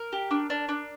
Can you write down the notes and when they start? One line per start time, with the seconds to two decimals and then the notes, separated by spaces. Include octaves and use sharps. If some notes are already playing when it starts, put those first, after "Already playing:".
Already playing: A#4
0.13 G4
0.31 D4
0.50 D4
0.69 D4